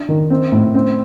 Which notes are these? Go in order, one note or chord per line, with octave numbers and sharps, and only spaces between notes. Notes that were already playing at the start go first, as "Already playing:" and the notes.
Already playing: D4
D#3
C4
A2
C4